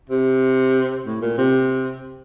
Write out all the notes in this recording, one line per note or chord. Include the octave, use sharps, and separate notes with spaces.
C3
A2
A#2
C3